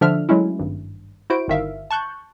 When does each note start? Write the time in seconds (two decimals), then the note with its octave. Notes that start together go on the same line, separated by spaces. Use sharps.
0.01 D3 F3 D4 E5 F6
0.29 F#3 G#3 A3 C#4 E4
0.59 G#1 G2
1.30 E4 F#4 C5 D7
1.48 G1 D#3 E5 F5
1.91 A5 C#6 F#6 G6